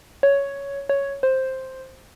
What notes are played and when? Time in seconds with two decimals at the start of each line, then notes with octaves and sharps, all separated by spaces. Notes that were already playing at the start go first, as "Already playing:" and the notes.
0.23 C#5
0.89 C#5
1.23 C5